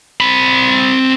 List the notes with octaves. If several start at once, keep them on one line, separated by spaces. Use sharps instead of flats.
C4 B5